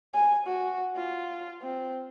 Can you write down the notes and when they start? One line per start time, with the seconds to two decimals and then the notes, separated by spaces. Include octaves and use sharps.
0.14 G#5
0.47 F#4
0.96 F4
1.62 C4